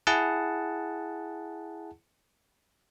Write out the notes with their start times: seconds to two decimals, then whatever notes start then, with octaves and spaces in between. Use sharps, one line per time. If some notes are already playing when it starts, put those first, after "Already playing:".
0.07 E4 G#4 F#5 A5